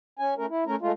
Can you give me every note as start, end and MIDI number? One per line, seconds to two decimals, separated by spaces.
0.19 0.34 61
0.19 0.34 80
0.37 0.46 57
0.37 0.46 61
0.37 0.46 70
0.49 0.64 64
0.66 0.76 57
0.66 0.76 61
0.66 0.76 70
0.81 0.92 56
0.81 0.92 57
0.81 0.92 65